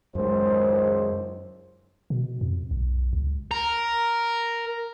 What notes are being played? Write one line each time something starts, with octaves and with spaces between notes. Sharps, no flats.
C#2 F#2 D#3 G#3 C5
B2
F2
B1
C#2
A#4